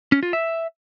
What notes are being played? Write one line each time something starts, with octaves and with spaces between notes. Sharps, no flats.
C#4
F4
E5